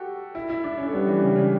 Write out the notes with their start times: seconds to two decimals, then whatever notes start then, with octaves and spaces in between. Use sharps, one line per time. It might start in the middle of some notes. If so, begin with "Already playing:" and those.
Already playing: F#4 G4 A4
0.35 E4
0.49 E4
0.64 D4
0.78 C#4
0.86 A3
0.93 G3 B3
1.07 E3
1.22 C#3
1.36 C#3